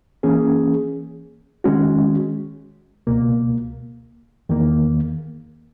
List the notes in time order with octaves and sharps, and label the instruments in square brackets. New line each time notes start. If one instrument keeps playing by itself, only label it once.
[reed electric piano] E3 A#3 C#4 G#4
D#3 G#3 C#4 F#4
C#2 B2 A#3
E2 D#3 A#3